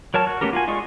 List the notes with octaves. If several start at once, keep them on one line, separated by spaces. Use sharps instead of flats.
F#3 A#4 C#5 A5 F6
F#4
A3 B3 C#4 G4 A#4
F4 F#4 G#5
G#3 F4 D5 D#5 C#6